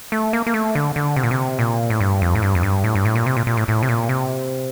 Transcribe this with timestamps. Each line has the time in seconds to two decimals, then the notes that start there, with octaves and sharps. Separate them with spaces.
0.12 A3
0.33 A#3
0.46 A#3
0.54 A3
0.75 D3
0.96 D3
1.16 C3
1.23 A#2
1.31 C3
1.59 A#2
1.90 A2
2.01 G2
2.22 F2
2.35 A2
2.42 G2
2.55 F2
2.63 G2
2.84 A2
2.95 G2
3.05 A2
3.15 A#2
3.26 C3
3.37 A#2
3.47 A#2
3.57 A2
3.68 A2
3.83 C3
3.89 A#2
4.09 C3